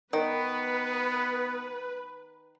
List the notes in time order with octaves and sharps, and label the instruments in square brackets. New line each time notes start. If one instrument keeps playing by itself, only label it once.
[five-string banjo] D#3 [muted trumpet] B3 [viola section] B4